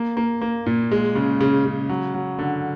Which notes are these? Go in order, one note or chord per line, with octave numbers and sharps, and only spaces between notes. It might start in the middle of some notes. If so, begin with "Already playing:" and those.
Already playing: A#3
A#3
A#3
A#2
G#3
C#3
C#3
C#3
F#3
F#3
D3